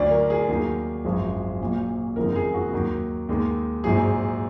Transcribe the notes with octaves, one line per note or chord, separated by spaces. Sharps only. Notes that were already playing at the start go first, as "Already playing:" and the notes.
Already playing: D2 D3 F#3 D5
A#4
G#4
D#2 D#3 F#3 G#4
G#1 F#2 F3 G#3
A#1 A#2 F#3
F#1 F2 D#3 G#3 A#4
G#4
F#4
D#2 D#3 F#3
D#2 D#3 G#3
A#1 G#2 F#3 G#4